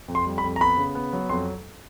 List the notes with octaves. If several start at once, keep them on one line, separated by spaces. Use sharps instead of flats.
F2
C6
G3
B5
F2
A#5
B3 B5
C#3
B3
F#3
F2 C6